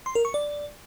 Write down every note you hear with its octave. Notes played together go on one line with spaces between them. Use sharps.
C6
A#4
C#6
D5